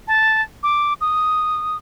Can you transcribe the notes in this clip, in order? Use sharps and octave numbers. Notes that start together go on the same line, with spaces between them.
A5
D6
D#6